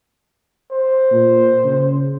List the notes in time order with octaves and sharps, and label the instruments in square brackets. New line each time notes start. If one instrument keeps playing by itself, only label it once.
[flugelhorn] C5
[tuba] A#2
C#3